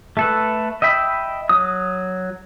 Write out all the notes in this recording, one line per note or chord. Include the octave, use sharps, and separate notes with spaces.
A3 A4 B4
D#5 E5 G5 B5
F#3 D#6